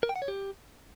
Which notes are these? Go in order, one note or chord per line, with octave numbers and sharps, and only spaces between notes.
A#4
G5
F#5
C#5
G4